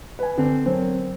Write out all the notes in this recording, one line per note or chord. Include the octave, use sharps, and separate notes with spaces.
B4 G#5
D3 C4 D4
F#3 C4 A#4